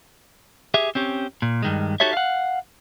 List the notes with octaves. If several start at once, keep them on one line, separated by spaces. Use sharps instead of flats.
G4 G#4 E5
C4 C#4 G4
A#2
G2 D#3 G#3
D#4 F#4 G4 A4 C#5 E5
F5 F#5